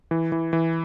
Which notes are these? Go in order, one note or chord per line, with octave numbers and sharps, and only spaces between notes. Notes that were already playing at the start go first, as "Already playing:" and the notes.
E3
E3
E3